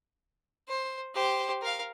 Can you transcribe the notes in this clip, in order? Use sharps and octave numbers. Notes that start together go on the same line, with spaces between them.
C5
G4 C5
A#4 F5